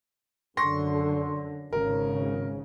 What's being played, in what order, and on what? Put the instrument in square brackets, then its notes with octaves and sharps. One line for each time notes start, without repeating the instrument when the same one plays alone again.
[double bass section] F#2 D3 [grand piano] C6 C#6 A#6
[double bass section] G#1 C#3 [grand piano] A#4